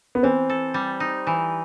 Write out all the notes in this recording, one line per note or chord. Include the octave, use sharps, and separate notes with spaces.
B3
E3 C4
A4
G3
D#4
E3